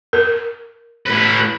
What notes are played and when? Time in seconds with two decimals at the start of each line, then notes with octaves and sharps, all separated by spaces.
0.13 A#4
1.06 A2 B4